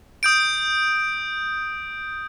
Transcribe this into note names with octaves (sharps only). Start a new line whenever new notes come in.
D#6 G6 D7